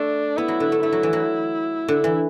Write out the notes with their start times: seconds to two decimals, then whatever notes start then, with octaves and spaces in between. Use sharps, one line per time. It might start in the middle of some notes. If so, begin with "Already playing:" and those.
Already playing: A3 D4
0.37 B3 E4
0.48 F#3
0.60 D3
0.72 A3
0.83 A3 E4
0.92 F#3
1.03 E3
1.13 F#3
1.88 D3
2.04 E3